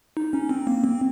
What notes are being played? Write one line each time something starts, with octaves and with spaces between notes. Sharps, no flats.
D#4
C#4
C4
A#3
C4